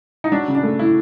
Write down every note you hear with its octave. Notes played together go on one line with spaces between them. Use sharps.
D#4
F#3 D4
C#3
D4
A3
C#3 E4